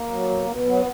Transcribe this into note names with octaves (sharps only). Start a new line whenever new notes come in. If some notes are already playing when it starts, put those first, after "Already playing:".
Already playing: A#3
F#3
B2
B2
F#3 B3